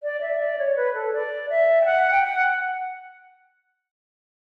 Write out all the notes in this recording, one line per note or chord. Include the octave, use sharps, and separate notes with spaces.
D5
E5
D5
C#5
B4
A4
D5
E5
G5
F#5
G5
F#5